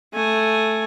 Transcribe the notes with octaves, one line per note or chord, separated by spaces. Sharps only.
A3 G#5